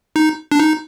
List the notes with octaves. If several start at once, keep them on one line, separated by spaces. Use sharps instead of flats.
D#4
D4
D#4